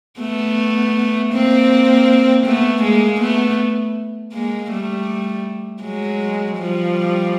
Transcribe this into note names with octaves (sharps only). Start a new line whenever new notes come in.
A3 B3
A#3 C4
A3 B3
G#3 A#3
A3 B3
G#3 A#3
G3 A3
F#3 G#3
F3 G3